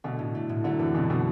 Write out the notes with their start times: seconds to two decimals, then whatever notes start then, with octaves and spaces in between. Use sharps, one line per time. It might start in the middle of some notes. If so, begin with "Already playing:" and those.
0.04 B2 D3 A3
0.19 A2
0.35 A3
0.49 A2
0.64 D3 F#3 A3
0.79 F#2 C3 E3
0.95 B2 D3 E4
1.10 B2 A3